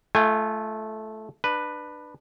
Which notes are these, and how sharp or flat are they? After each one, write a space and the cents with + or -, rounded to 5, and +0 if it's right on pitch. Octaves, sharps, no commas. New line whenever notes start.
A3 -15 F4 -40 G#5 -30
D4 +25 B4 +0